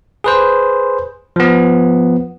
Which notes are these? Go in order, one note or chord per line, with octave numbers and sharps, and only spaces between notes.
G#4 B4 C5
F3 B3